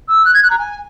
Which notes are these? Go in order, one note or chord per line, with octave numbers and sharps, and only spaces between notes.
E6
F#6
G#6
F#6
A#5
G#5